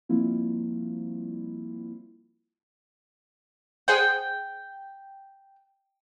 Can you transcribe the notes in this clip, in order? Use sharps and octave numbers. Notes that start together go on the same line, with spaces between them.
F3 G3 A#3 C4 E4 F4
G#4 C5 F#5 G5